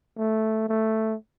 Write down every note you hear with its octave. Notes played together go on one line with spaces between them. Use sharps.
A3
A3